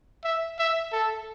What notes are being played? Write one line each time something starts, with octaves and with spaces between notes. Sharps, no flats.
E5
E5
A4